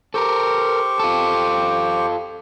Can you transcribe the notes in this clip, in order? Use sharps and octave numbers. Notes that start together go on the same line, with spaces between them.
G4 A4 A#4 C5 C#6
F4 A4